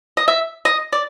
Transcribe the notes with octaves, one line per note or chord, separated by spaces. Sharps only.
D#5
E5
D#5
D5